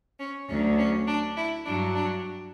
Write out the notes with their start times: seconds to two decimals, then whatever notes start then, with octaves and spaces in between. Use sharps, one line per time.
0.19 C#4
0.48 D2 D3 F#3 C#4
0.78 C#4
1.07 D4
1.36 E4
1.65 G2 F#3 D4
1.94 D4